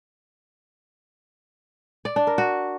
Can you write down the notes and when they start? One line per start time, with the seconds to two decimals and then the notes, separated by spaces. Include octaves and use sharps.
2.05 D5
2.16 D4
2.27 A#4
2.38 F#4